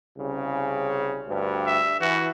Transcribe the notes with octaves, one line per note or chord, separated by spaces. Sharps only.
C2 C#3
D2 G2
E5
E3 F#4